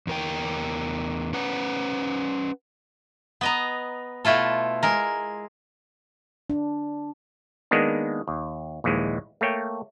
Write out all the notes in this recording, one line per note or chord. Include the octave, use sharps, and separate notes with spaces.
E2 A#4 G5
C#4 B4 F#5 A#5
B3 D#5 A#5
B2 A3 E4 F4 A4
G#3 A#4
D4
D#3 G#3 A#3 B3 D4
D#2
A#1 D#2 E3 G#3
A3 A#3 C#5 G5